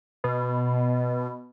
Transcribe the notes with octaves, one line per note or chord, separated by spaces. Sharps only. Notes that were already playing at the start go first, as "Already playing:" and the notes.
B2